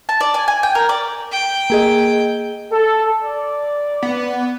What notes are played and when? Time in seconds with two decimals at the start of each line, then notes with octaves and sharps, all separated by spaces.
0.09 A5
0.21 D5
0.34 G#5
0.48 G#5
0.63 G5
0.75 A#4
0.89 D5
1.32 G5
1.70 A#3 G#4 D#5
2.71 A4
3.24 D5
4.02 B3